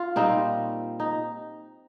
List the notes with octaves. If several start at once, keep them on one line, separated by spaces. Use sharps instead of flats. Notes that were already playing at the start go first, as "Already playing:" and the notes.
Already playing: F4
A#2 G3 C4 D#4
D#4